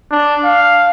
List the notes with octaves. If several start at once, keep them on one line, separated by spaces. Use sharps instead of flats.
D4
F5